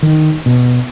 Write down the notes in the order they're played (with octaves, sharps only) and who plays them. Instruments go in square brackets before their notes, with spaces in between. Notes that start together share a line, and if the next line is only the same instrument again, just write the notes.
[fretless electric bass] D#3
B2